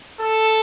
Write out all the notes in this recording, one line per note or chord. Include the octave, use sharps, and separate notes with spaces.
A4